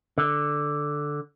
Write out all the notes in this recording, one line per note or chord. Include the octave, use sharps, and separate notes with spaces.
D3